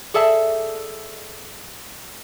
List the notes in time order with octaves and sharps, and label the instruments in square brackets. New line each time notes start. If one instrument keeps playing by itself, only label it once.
[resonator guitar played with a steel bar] G#4 A4 D5 E5 A5